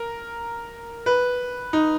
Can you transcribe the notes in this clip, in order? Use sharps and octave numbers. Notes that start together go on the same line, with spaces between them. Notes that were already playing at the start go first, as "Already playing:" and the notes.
Already playing: A#4
B4
D#4